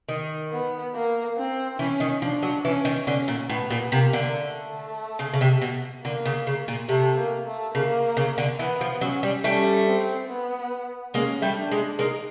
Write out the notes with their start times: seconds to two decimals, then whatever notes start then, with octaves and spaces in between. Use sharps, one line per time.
0.09 D#3
0.52 B3
0.95 A#3
1.37 C4
1.79 E3 C#4
2.00 D#3
2.22 F3 D4
2.43 F#3
2.65 E3 C#4
2.85 D#3
3.06 D3 C#4
3.28 A#2
3.49 A2 B3
3.70 A#2
3.92 C3 A#3
4.13 D3
4.34 A3
5.19 C#3
5.34 C#3
5.41 C3
5.62 B2
6.04 D3 A#3
6.26 C#3
6.47 C#3
6.68 A#2
6.89 C3 A3
7.18 A#3
7.46 A3
7.74 C#3 A#3
8.17 C#3
8.38 D3
8.59 E3 B3
8.81 F3
9.01 F#3 C#4
9.23 G3
9.44 G3 A3 C#4
9.87 C4
10.29 B3
11.14 G#3 A#3 C#4
11.42 G3 A3
11.56 D4
11.71 G#3
11.99 G#3 A#3 D#4